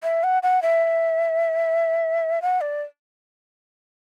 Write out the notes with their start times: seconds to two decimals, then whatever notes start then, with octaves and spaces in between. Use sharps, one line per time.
0.03 E5
0.23 F#5
0.43 F#5
0.62 E5
2.42 F#5
2.61 D5